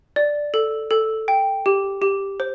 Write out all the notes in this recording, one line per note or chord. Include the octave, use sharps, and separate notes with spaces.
D5
A4
A4
G5
G4
G4
C5